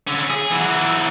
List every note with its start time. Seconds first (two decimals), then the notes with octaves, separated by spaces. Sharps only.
0.07 D3 C#4
0.30 G#4
0.51 E3 F#3